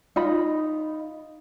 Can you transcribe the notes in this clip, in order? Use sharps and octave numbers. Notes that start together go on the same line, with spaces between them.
D#4 F4 D#5 B5